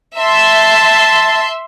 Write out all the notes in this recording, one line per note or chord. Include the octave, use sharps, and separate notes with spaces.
E5 A5 C6